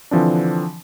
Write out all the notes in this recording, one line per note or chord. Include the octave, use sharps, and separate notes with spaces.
D3 E3 F3 C4 D4